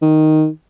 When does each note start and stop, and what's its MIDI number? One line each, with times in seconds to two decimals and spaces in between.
0.02 0.48 51